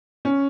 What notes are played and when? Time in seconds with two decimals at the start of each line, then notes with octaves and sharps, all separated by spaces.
0.25 C#4